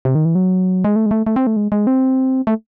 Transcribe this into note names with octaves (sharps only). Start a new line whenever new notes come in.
C3
D#3
E3
F#3
G#3
A3
G#3
A3
A3
C4
A3
G#3
G#3
C4
A3